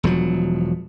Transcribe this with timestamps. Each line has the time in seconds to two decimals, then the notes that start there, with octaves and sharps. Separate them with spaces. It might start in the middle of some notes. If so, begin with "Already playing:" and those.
0.04 E1 F3 F#3